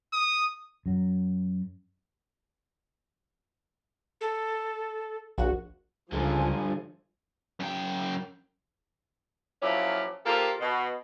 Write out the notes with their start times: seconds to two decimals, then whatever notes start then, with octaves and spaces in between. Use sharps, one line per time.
0.13 D#6
0.86 F#2 F#3
4.21 A4
5.38 A#1 F#4
6.12 C#2 G2 D3 F3 G#5
7.60 F#2 G5
9.62 A#2 F3 F#3 C#4 E4 G4
10.26 A#3 F4 G4 A4 A#4 C5
10.60 B2